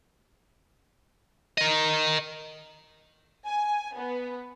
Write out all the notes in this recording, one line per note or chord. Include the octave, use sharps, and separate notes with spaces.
A#4 D#5
G#5
B3